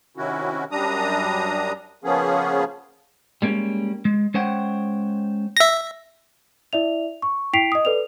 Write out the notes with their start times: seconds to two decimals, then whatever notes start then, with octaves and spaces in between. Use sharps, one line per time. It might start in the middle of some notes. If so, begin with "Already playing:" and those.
0.17 C3 D#3 C#4 E4 F#4
0.71 F#2 G3 D4 A#5 D#6
2.04 C#3 F3 A#3 B3 C#4 G#4
3.42 G3 G#3 A#3 C#4
4.05 G#3
4.34 G#3 C#4 C5 C#5 F#5 G5
5.57 E5 A#6
6.73 E4 D5 E5 F7
7.22 C#6
7.53 E4 G5 B6 C7 D7 F7
7.72 D#5 D#6
7.85 A4 B4 D5 F7